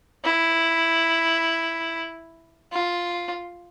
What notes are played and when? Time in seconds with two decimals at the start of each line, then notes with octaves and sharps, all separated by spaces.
0.25 E4
2.72 F4